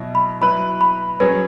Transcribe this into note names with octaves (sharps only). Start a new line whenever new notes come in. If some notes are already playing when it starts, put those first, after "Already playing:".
Already playing: B2 F#3 E4
B5
F#3 E4 B4 B5
B5
F#3 C#4 G#4 B4 C#5